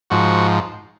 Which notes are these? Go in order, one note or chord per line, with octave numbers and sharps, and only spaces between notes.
G#2 F3 F#4